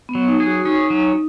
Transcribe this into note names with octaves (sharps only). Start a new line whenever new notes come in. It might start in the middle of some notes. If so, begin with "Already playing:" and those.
B3
F#3
D#4
G#4
F#4
C#4 D#4
F#3